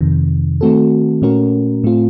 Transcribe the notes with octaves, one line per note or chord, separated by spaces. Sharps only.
F2 C3 D#3
D#3 A3 C4 F#4 A4
A#2 A3 C#4 F#4 A#4
A2 A3 C4 F4